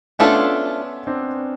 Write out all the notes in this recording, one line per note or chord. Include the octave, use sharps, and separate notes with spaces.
A3 B3 C#4 D4 F4 A4
C4 D4